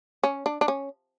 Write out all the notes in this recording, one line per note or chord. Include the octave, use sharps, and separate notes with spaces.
C#4
D4
D4
C#4